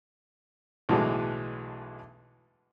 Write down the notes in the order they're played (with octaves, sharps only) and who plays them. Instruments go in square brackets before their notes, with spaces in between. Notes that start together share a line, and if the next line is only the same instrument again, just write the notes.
[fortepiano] B1 A2 D3 E3 F#3 G#3